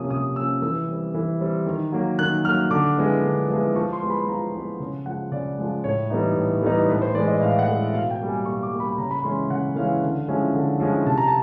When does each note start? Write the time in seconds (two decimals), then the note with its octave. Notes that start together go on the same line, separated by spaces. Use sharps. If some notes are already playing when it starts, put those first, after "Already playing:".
Already playing: C3 F3 A#3 C#4 D#6
0.10 C3 D#6
0.36 F3 A#3 C#4 E6
0.62 E3 E6
0.88 G3 C4
1.14 E3
1.41 G3 C4
1.66 D#3
1.92 F#3 A#3
2.19 D#3 F#6
2.45 F#3 A#3 F6
2.71 D3 D6
2.97 F3 G#3 B3 E4
3.23 D3
3.49 F3 G#3 B3 E4
3.75 F3 C#6
3.93 C6
4.02 G#3 B3 E4
4.10 B5
4.27 F3 A#5
4.54 G#3 B3 E4
4.80 C#3
5.06 F3 G#3 F#5
5.32 C#3 D5
5.58 F3 G#3
5.84 A2 C#5
6.10 E3 G3 B3 D#4
6.36 A2
6.62 E3 G3 B3 D#4
6.89 A2 B4
7.02 C5
7.14 E3 D5
7.18 G#3
7.28 D#5
7.41 A2 F5
7.59 F#5
7.67 E3 G#3
7.75 E5
7.93 B2 F5
8.10 G5
8.20 G3 A#3
8.28 G#5
8.45 B2 C#6
8.63 D6
8.71 G3 A#3
8.80 B5
8.98 C#3 A#5
9.11 B5
9.24 E3 G#3 C#4 E4 C6
9.50 C#3 F#5
9.76 E3 G#3 C#4 E4 F5
10.02 D3
10.28 F3 G#3 C#4 E4
10.54 D3
10.80 F3 G#3 C#4 E4
11.06 C3 A5
11.18 A#5
11.28 A5